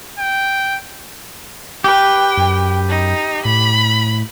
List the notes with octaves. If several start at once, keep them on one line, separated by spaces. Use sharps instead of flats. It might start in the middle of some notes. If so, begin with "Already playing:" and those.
G5
G4 B4 G5
F#2
D#4
A2 B5